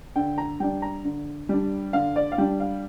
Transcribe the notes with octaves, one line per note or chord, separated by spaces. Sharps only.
D3 G5
A#5
G3 D4 G5
A#5
D3
G3 D4
D3 F5
D5
F5
G3 D4 G5
F5